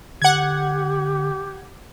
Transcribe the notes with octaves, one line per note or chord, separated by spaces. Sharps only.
D3 G4 F#5 G#6